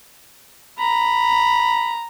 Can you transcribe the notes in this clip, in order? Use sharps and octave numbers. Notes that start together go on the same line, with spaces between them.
A#5 B5